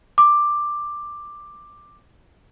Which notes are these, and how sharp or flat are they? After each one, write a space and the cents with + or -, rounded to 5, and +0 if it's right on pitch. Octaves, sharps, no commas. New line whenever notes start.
D6 +10